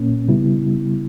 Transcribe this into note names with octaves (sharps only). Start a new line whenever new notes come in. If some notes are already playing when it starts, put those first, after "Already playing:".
Already playing: A#2 A#3 C#4
C#3 G3 B3 E4